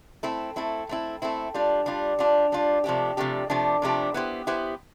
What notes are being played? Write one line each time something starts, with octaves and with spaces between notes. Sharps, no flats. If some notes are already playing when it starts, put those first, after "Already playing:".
A3 C4 E4
A3 C4 E4
A3 C4 E4
A3 C4 E4
G3 D4 F4
G3 D4 F4
G3 D4 F4
G3 D4 F4
C3 F3 A3 D4 G4
C3 F3 A3 D4 G4
C3 F3 A3 D4 G4
C3 F3 A3 D4 G4
B3 E4 G4 C5
B3 E4 G4 C5